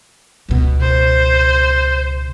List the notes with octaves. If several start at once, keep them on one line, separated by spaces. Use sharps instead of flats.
C#2 B2
C5